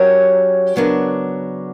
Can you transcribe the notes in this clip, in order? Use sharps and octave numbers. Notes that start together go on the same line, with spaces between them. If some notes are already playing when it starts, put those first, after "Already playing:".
Already playing: F#3 C#4 G4 A#4 C#5
C#3 F#3 B3 D4 A#4